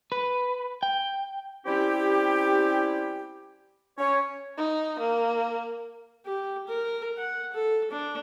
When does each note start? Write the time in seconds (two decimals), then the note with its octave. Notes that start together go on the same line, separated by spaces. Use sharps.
0.12 B4
0.83 G5
1.65 G3 C4 C#4 E4 G4
3.98 C#4 C#5
4.58 D#4
5.00 A#3
6.26 G4
6.68 A#4
7.17 F#5
7.53 A4
7.91 D4